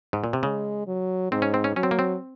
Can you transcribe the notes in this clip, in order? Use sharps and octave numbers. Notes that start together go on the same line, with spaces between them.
G#2
A#2
C3
C#3 G#3
F#3
G#2 C4
C#4
C4
C#4
F#3 C#4
C4
A#3
C4